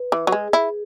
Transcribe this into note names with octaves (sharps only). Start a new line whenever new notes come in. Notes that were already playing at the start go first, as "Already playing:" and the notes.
Already playing: B4
E3
F#3
G#3 G#4
E4